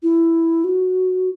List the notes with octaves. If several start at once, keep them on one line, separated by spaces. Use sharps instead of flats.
E4
F#4